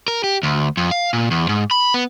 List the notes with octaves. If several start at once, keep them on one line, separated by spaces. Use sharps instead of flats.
A#4
G4
D2
F2
F5
A#2
E2
G#2
B5
B3